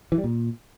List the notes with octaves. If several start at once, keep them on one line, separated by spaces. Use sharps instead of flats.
E3
G3
A#2